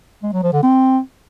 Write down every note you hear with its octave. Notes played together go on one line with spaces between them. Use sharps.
G#3
F#3
F3
D3
C4